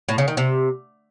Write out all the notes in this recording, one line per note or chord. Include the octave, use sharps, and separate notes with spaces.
A2
C#3
D#3
C3